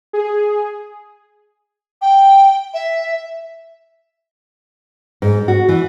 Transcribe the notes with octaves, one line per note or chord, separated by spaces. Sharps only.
G#4
G5
E5
G#2
F#4
E3